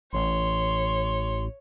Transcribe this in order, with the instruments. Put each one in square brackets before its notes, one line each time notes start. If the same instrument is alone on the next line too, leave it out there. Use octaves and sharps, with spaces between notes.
[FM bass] A1 [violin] C#5 [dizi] C6